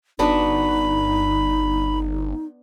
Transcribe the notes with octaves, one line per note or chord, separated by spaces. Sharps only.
G1 B3 D4 D#4 F#4 B5